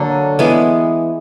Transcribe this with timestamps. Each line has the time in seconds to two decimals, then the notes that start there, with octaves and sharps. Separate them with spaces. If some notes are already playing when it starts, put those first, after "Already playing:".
Already playing: D3 F#3 A#3 A4
0.39 E3 G#3 B3